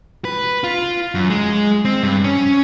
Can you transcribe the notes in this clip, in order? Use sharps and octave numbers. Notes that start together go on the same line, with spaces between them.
B4
F4
F#2
G#3
C4
G2
C#4